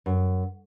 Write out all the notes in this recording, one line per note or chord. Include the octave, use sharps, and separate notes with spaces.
F#2